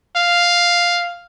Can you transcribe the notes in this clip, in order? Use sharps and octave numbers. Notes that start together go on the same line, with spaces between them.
F5